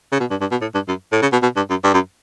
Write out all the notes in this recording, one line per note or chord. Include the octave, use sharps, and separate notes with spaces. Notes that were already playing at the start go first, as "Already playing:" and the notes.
C#3
B2
G2
G2
B2
A2
G2
F#2
A2
C#3
B2
B2
G2
F#2
G2
F#2